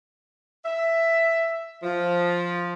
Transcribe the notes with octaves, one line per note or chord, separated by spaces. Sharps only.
E5
F3